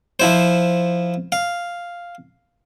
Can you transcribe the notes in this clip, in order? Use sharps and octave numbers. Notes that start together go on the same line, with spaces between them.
F3 E4 C5
F5